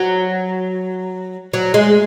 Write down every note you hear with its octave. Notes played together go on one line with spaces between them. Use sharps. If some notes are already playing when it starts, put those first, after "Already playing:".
Already playing: F#3
F#3
G#3